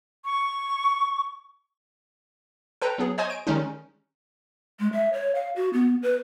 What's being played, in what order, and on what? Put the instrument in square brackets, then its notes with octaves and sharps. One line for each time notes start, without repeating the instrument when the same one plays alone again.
[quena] C#6
[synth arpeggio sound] A4 B4 G5 A#5
F#3 B3 G#4
C5 C#5 D#5 G#5 D#6 G#6
D7
D#3 G3 G#3 C#4 D#4
[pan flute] G#3
E5
C#5
F5
F#4
B3
B4